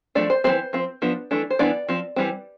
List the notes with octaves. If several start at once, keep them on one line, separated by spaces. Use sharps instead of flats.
F3 A3 D4 D5
C5
E3 A3 C4 C5
F3 C4
F3 B3 D4
E3 A3 D4
C5
E3 B3 D4 D5
F3 C4
E3 G3 C4